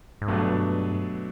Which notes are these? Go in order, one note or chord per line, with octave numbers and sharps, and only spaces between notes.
G#2
G2 B2 F#3 A3 D4